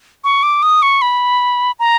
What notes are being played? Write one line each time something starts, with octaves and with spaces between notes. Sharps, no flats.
C#6
D6
D#6
C#6
B5
A#5